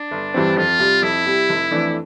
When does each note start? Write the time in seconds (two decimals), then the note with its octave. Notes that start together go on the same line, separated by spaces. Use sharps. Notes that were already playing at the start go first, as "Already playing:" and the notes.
Already playing: D4
0.11 G1
0.34 G2 E3 G3 C4
0.57 F2 F4
0.79 C3 G3
1.02 F2 E4
1.26 C3 G3
1.49 F1
1.71 F2 E3 A3 D4